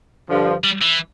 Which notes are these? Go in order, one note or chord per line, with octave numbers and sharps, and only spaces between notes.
G2 D3 F3
G3
E3